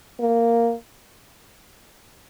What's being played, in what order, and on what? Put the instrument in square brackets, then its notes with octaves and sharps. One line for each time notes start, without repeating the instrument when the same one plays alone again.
[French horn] A#3